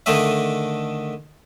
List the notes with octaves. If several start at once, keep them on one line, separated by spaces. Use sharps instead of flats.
D3 D#3 A3 D4 D#5 E5